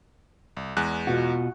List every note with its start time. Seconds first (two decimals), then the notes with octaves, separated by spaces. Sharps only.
0.57 C2
0.77 E2 G#3 F#6
1.07 B2 F4 F#4